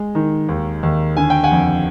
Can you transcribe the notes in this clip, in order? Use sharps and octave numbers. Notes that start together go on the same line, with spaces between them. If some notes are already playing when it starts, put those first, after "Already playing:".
Already playing: G#3
D#3
D#2
D#2
D3 G#5
G5
F#5 G#5
F2